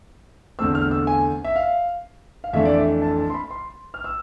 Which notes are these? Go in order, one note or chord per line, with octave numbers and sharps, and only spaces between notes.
E2 D3 A3 C4 E6
F6
E6
G#5
E5
F5
F5
F2 E3 A3 D4 E5
D5
E5
A5
A5
C6
B5
C6
F6
E6